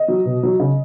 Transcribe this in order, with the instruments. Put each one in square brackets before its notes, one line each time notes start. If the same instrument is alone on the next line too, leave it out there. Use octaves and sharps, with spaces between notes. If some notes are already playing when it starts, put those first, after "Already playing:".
Already playing: [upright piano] D#5
F#3
B2
F#3
C#3